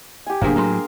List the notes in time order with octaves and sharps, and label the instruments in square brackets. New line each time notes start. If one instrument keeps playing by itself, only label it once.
[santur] G4 G#5
[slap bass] F1 F#2 A#2 [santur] A#3 G#4 [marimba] D4 C5
[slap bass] A2 F#3 [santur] A#4 C6